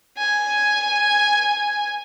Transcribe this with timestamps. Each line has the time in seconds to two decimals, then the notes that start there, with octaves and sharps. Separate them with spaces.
0.18 G#5